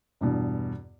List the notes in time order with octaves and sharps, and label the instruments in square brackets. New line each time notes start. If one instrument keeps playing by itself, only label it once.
[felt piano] E2 G2 B2